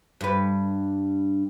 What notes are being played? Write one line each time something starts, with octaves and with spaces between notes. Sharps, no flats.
G2 B4